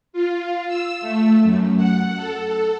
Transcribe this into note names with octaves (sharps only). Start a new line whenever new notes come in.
F4
E6
A3
F#2
F#5
A4
A4